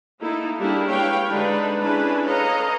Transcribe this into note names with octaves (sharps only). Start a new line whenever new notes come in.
A#3 D#4 E4 A4
G3 A#3 D4 E4 G4 G#4
G#3 G4 B4 C#5 F5 G5
D3 G#3 D4 D#4 B4
C#4 D4 E4 G#4 B4
A4 B4 C#5 D#5 F5 A#5